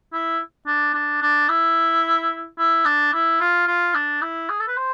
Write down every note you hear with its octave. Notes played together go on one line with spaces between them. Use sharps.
E4
D4
D4
D4
E4
E4
D4
E4
F4
F4
D4
E4
G#4
A4
B4
C5